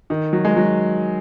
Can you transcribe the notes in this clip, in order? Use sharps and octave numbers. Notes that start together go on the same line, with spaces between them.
D#3
F#3
G#3
F#3